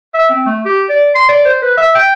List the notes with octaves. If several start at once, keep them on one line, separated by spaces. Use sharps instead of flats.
E5
C4
A3
G4
D5
C6
D5
C5
B4
E5
G5